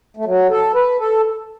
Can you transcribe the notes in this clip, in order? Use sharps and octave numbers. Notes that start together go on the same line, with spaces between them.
A3
F#3
A4
B4
A4